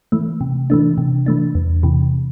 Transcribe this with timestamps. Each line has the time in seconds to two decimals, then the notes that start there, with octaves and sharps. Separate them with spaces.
0.12 E3 A3
0.41 C3
0.70 E3 A3 D4
0.98 C3
1.26 E3 A3 D4
1.55 E2
1.83 C3 E3